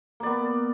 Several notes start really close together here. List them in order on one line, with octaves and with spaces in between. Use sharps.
A#3 D5 B3